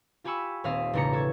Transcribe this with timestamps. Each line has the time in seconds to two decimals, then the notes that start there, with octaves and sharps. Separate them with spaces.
0.24 F4 G4 G#5 B5 C#6 E6
0.64 D#1 C4 C#5 E5 F5 D#6
0.93 E1 A1 C#3 D4 A#5 C#7
1.13 A4 C#6 G#6